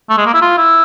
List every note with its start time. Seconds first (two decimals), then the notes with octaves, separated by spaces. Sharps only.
0.10 A3
0.17 G#3
0.26 A#3
0.34 E4
0.42 F4
0.58 E4